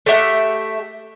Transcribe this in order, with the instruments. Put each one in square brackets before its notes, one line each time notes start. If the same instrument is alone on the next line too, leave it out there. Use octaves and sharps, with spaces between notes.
[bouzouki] A3 G4 E5 F#5